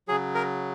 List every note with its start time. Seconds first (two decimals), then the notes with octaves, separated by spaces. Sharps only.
0.08 C#3 F#3 G#4
0.35 A#4